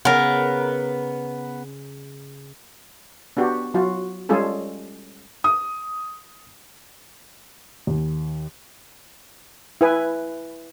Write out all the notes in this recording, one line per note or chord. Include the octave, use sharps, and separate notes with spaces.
C#3 B3 A#4
B3 D4 F#4 G4
F#3 F4 F#4
G3 G#3 C#4 F4 G#4 A4
D#6
D#2
E4 B4 G#5